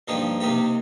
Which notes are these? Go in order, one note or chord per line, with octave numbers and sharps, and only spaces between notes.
G2 F3 A#3 D#4 G4
C3 D#3 A#3 D#4 G4